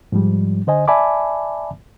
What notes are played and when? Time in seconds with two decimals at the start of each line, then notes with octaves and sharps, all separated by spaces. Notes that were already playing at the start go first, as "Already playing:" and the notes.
0.12 G#2 F3 G3
0.67 D3 C5 D#5 G#5
0.88 D5 E5 G#5 A5 B5 D6